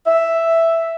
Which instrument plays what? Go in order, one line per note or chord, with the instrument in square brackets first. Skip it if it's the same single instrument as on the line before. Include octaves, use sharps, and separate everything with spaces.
[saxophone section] E5